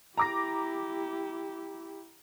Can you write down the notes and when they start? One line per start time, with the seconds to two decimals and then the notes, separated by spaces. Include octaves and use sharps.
0.18 E4 G4 A#5 D6 A#6